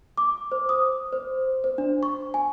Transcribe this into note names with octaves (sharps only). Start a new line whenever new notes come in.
D6
C5
D#6
C5
C5
D4
C#6
G#5